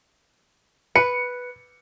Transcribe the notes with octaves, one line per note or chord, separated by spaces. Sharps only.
B4 C#7